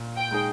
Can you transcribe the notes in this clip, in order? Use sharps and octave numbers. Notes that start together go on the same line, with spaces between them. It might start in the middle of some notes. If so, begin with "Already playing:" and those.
Already playing: A#2
G5
G#3 D#4 G#4